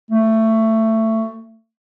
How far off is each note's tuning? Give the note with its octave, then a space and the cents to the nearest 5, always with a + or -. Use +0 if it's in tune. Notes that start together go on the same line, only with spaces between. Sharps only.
A3 +15